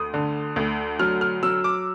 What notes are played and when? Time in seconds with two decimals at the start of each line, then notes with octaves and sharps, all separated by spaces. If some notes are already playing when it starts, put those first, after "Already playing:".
Already playing: D2 D#6
0.14 D3
0.56 D2
0.99 F#3 F6
1.21 F6
1.43 F#3 E6
1.64 D6